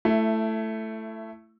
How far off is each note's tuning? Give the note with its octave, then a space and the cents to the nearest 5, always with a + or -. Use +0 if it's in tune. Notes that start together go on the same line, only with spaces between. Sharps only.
A3 +0 E4 +20